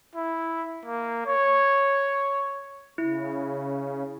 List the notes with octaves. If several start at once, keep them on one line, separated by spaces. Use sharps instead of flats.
E4
A#3
C#5
C#3 E4